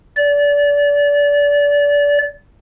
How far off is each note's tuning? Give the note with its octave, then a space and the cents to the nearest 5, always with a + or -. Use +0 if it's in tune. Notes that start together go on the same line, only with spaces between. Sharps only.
D5 -25